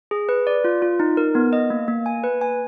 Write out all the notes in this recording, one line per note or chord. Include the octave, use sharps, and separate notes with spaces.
G#4
B4
D5
F4
F4
D#4
A#4
B3
D#5
A#3
A#3
G#5
B4
G#5